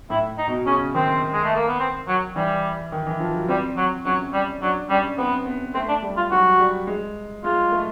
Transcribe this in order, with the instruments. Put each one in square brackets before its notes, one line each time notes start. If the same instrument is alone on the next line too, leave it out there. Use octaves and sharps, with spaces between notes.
[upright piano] A2 [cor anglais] E4
[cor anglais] D#4
[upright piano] B2
[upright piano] C#3 [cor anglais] C#4
[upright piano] D#3 [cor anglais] C4
[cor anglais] G#3
A3
A#3
B3
C4
F#3
[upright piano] E3 [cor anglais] G3
[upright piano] D#3
E3
F3
F#3
[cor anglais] G3 [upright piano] C4
[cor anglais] F#3
[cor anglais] F#3 [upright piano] C#4
[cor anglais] G3
[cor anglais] F#3 [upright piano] D4
[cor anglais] G3 [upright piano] C#4
[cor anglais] B3 [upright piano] C4
[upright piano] B3
[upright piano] A3 [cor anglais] C4
[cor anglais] D4
[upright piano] G3
[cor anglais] F4
[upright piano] F#3 [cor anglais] F#4
[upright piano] G3
G#3
[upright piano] G#3 [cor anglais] F4
[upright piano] A3